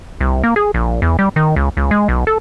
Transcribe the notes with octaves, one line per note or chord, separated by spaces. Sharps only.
C2
A#3
G#4
A#1
E2
G3
D#3
C#2
C#2
G#3
B1
A4